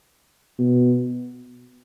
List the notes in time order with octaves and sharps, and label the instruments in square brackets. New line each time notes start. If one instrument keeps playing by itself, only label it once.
[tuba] B2